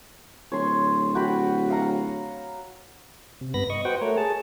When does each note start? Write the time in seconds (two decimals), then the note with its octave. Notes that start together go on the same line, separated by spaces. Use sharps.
0.52 D1 C#5 C6
1.15 F#4 G5 B5
1.70 F5 F#5 A#5
3.41 C3
3.54 G2 B3 B5 A#6
3.70 D#5 C#6
3.85 F#4 B4 C5 F#5 G5
4.01 A3 A#4 C#5
4.17 G#4 A5